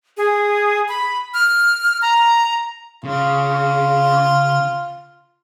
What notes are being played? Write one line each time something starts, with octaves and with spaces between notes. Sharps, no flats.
G#4
B5
F6
A#5
C#3 F4